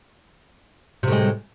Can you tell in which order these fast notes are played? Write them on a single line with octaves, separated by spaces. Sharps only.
C3 A2 G#3